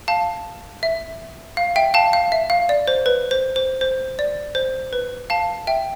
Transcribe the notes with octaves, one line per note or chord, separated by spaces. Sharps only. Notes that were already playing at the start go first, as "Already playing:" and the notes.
F5 A5
E5
F5
E5 G5
F5 A5
F5
E5
F5
D5
C5
B4
C5
C5
C5
D5
C5
B4
F5 A5
E5 G5